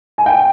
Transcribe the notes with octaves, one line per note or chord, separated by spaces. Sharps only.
G#5
G5